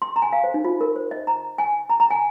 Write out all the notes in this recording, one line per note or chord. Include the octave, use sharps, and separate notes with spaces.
C6
A#5
G#5
F5
C5
D#4
F4
A#4
C5
D#5
A#5
G#5
A#5
A#5
G#5